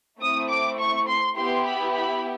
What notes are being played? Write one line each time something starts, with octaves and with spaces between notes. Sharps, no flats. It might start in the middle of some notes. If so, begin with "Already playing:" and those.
A3 C4 E4 D#6
D6
C#6
C6
B3 E4 G4 C6
B5
B5